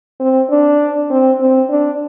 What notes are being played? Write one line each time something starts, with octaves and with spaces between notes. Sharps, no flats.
C4
D4
C4
C4
D4